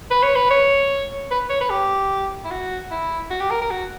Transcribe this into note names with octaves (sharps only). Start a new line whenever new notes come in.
B4
C#5
B4
C#5
B4
C#5
B4
G4
E4
F#4
E4
F#4
G4
A#4
A#4
F#4